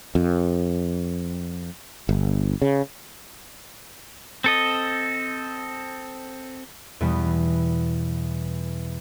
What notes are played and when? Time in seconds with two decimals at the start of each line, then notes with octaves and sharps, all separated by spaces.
0.15 F2
2.09 G1
2.62 C#3
4.44 C4 A4 D#5
7.01 E2 B2 G3 B3